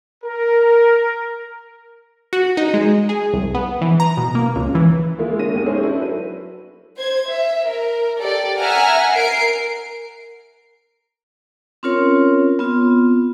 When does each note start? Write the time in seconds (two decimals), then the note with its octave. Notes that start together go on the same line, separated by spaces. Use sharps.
0.24 A#4
2.33 F#4
2.57 D#4
2.74 G#3
3.09 G#4
3.34 C2
3.55 B3
3.81 E3
4.00 A#5
4.17 B2
4.35 A#3
4.56 C#2
4.75 E3
5.18 G#3 A#3 E4 F4
5.39 D3 A#3 C#4 A#6 D#7
5.54 B1 G#3 G4 D#7
5.66 C#4 D#4 E4 G#4 C5 C#5
5.83 D4 E4
6.00 F#3 B4 D#7
6.98 C5 G#6
7.31 E5
7.69 A#4
8.20 G4 A4 D5
8.58 E5 F#5 G#5 A#5 F6
9.12 A#4 C7 D7
11.83 C4 C#4 F4 A#4 C#5
12.59 B3 C4 F4